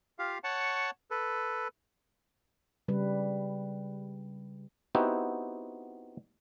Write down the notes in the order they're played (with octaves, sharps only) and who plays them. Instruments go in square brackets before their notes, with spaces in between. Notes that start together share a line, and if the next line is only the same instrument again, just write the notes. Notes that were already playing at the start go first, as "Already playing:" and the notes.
[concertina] F4 G4 F5
C#5 F#5 A5 C#6
A4 B4
[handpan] C#3 G3 B4
[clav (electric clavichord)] B3 C4 D#4 E4 F#4 G4